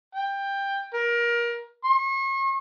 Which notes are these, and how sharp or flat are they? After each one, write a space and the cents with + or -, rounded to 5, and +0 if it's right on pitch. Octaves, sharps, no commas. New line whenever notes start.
G5 +15
A#4 +25
C#6 -40